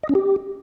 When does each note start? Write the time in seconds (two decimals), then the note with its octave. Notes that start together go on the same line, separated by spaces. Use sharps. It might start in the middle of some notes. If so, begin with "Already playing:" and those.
0.03 D#5
0.09 C#4
0.15 G4